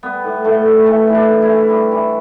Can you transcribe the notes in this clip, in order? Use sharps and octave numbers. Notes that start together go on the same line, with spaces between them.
G3 B3
A2
A2 A3
G3
E3 A3
E3
D4
A2
E4
E3
G3
E3